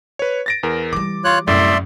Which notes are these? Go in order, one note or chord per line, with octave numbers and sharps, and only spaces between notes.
B4 C#5
A6 A#6 D7
E2 A#4
E3 G3 D6
F4 C#5 F#6
C2 F#2 A2 D5 E5 C6